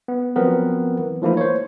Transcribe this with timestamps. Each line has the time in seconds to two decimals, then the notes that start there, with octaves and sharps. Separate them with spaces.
0.08 B3
0.36 F3 F#3 B3 C4 A#4 B4
0.99 E3
1.22 E3 F3 A3 A#3 D#4 E4
1.37 C5 C#5